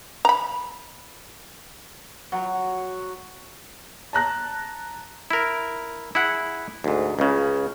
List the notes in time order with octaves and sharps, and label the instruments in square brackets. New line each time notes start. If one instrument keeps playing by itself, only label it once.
[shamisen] A#5 B5
[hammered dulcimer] F#3
[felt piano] A5 A#5 F#6 A#6
[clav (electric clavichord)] E4 A#4
E4 G#4 F#5
D2 G#2
C#2 C#3